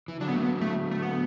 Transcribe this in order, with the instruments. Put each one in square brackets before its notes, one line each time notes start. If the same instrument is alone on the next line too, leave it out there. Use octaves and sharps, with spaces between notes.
[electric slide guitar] E3
[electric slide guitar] D3 F#3 [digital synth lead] D4
[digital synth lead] B3
A3
B3
A3
A3
B3